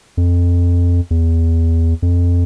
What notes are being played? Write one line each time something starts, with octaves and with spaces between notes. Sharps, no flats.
F2
E2
F2